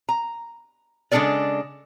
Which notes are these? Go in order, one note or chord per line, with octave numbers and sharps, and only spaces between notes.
A#5
C#3 G#3 D4 A4 A#4 D5